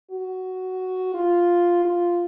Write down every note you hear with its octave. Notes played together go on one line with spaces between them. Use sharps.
F#4
F4
F4